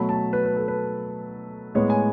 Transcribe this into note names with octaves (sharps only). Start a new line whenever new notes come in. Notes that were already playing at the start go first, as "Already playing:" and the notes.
Already playing: B2 F#3 A3 B5
A5
B4
B4
A4
B4
A2 G#3 B3 C#5
G#5